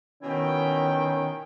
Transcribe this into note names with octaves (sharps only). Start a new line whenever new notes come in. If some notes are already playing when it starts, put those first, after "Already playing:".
B2 D#3 C#4 E4 G5